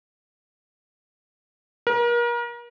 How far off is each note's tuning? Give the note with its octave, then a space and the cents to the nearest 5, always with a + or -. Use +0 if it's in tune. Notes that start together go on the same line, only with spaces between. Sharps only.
A#4 +35